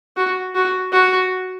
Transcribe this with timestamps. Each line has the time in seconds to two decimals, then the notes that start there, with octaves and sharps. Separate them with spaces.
0.17 F#4
0.55 F#4
0.92 F#4